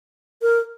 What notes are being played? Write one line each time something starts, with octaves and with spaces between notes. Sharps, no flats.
A#4